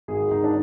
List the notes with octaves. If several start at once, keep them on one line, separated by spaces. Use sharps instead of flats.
G#1 G#4
G#1 D#4
D4